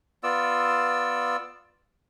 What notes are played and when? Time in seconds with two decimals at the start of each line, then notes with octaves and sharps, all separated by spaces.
0.23 B3 F4 D5 E6